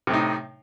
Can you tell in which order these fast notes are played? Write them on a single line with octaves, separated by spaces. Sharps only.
C3 A2 D#4